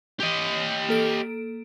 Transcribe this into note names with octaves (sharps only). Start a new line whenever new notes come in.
G4 D#5
A#3 A4 D7